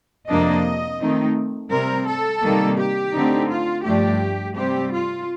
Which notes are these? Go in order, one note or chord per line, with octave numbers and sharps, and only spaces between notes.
F2 C3 F3 A#3 D4 D#5
D#3 A3 C4 D#4
C3 G3 C4 A#4
A4
C3 D#3 G3 A#3
G4
D3 A3 C4 D#4
F4
G2 F3 A3 D4 G4
C3 G3 C4 G4
F4